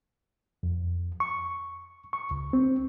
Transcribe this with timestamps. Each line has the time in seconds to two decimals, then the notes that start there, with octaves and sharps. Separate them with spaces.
0.63 F2
1.20 C#6
2.13 C#6
2.31 C#2
2.53 C4